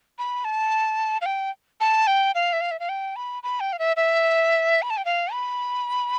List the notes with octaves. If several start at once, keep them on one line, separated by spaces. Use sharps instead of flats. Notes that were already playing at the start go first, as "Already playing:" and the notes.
B5
A5
F5
G5
A5
G5
F5
E5
F5
E5
F5
G5
B5
B5
G5
F5
E5
E5
B5
A5
G5
F5
B5